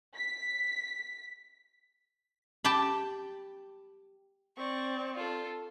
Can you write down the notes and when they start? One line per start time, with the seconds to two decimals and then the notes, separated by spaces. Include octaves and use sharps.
0.16 B6
2.64 G4 G5 A5 B5
4.57 C4 D5 C#6
5.15 F4 A4